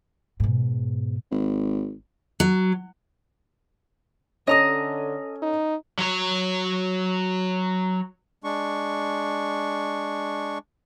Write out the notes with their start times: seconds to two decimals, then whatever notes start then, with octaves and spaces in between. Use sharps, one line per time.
0.40 G#2 B2
1.31 G#1
2.40 F#3
4.47 D3 C#4 A4 D#5 A#5 D#6
5.42 D#4
5.99 F#3 C#5
8.44 G#3 D4 C#6